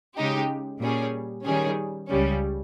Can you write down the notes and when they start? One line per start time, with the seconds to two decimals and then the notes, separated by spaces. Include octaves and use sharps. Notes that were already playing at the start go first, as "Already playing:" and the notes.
0.16 C#3 G#3 D#4 G4
0.80 A#2 G3 C#4 G#4
1.45 D#3 G3 C#4 G#4
2.09 C#2 C#3 G3 C#4